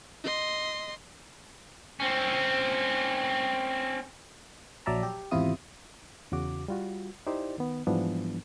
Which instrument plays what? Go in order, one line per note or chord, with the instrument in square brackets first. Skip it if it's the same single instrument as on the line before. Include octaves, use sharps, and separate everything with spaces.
[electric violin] D#5 C6
[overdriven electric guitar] C4 C#4
[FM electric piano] A#1 F#3 D5 E5 A5 A#5
G4
G#1 E2 C3 E4 F4 D#6
[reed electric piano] E2 C#3 F#4 D6
G3 F4 F#4
D#4 E4 G4 C5 D5
D#3 B3
G#2 E3 F3 G3 B3 D4